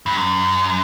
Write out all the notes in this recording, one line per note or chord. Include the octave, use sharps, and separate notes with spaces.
G2
F#2